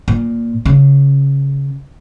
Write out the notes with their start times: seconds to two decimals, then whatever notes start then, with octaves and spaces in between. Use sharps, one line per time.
0.08 A#2
0.65 C#3